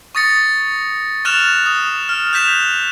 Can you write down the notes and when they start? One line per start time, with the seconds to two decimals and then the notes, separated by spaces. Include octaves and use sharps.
0.15 C#6 D#6 A6 A#6 C#7
1.25 C#6 F6 F#6 A6 E7 F7
1.66 D#6
2.09 F6
2.33 F#6 G6 B6 E7 F7